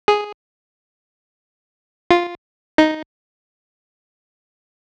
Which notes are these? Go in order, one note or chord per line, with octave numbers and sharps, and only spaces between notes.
G#4
F4
D#4